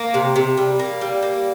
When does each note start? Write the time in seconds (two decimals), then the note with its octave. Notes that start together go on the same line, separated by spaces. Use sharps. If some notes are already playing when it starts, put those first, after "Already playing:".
Already playing: A#3
0.14 C3
0.36 C3
0.58 G3
0.79 A#3
1.01 G3
1.22 A#3